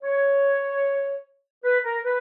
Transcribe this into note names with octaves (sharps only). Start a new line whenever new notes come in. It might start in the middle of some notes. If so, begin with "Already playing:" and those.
C#5
B4
A#4
B4